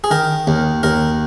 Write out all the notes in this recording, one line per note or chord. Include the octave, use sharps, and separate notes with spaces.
G#4
D#3 A#4
D#2
D#2 A#4